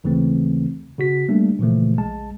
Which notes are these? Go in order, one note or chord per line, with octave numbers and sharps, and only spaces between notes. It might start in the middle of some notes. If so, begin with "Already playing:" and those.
D#2 C#3 E3 A3 C4
C#3 F#4 B6
G3 A3 A#3 D4
A#2 C#3 E3 F3 A3
A#1 G#3 A5